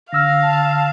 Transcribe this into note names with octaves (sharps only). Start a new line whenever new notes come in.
D3 F5 E6 F6 A#6
A5